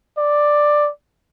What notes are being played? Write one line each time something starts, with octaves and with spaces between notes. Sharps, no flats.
D5